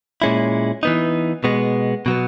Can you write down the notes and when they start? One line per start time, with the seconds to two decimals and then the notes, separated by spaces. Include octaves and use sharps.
0.22 A#2 G#3 C#4 E4
0.83 E3 B3 D#4
1.44 B2 G#3 B3
2.06 B2 F#3 B3